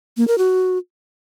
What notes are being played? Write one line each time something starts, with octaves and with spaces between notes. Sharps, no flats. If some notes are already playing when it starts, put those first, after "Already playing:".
A#3
A#4
F#4